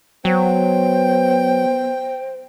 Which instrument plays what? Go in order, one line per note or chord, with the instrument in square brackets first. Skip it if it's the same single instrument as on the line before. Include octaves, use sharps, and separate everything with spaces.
[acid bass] F#3 [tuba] B3 [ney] C5 [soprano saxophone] G5